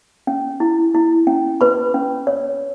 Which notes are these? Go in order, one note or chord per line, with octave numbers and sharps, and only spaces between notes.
C#4
E4
E4
C#4
B4 B5
C#4
C#5